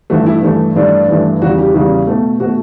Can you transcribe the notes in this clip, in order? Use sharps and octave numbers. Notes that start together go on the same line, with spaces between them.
G2 E3 A3 F#4
E4
G2 E3 A3
G2 E3 A3 D4
G2 E3 A3
E2 C#3 G3 F#4
G4
E2 C#3 G3 F#4
B2 A3
B2 A3 F#4